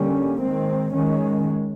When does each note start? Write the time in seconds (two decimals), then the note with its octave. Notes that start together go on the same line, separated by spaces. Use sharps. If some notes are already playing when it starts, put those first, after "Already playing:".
Already playing: D3 G3 A#3 C#4
0.40 D#3 G#3 C4
0.93 D#3 G#3 C#4